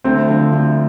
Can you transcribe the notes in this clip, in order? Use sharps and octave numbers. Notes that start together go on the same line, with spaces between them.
D2 C4
D3 F3
D2